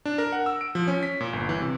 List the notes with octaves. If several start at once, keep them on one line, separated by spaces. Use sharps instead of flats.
D4
A#4
F#5
E6
D7
F3
C#4
B6
A#2
G1
E3
C3